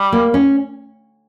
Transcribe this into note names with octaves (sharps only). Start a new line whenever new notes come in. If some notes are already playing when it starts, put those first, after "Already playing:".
Already playing: G3
A#3
C#4